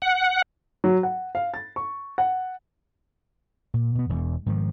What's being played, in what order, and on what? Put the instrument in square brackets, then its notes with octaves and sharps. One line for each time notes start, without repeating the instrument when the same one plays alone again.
[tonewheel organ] F#5
[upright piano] F#3
F#5
F5
A6
C#6
F#5
[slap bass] A#2
B2 B3
E1 E2
G#2 D#3 F3